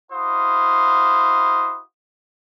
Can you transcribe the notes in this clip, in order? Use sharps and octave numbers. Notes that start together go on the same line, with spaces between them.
E4 F#4 C5 F5 D#6